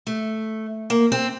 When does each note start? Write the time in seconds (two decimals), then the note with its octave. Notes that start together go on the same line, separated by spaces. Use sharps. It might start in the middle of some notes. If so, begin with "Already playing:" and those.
0.07 A3
0.90 A#3
1.12 C4